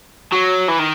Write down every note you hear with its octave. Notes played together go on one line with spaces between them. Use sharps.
F#3
E3
D#3